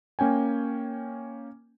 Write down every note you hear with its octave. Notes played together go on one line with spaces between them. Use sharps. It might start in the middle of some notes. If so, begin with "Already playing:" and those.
A#3 C#4 G5 G#5